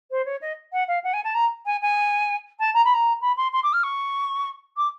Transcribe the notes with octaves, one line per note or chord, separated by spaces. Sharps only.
C5
C#5
D#5
F#5
F5
F#5
G#5
A5
A#5
G#5
G#5
A5
A#5
B5
A#5
B5
C6
C6
D6
F6
C#6
D6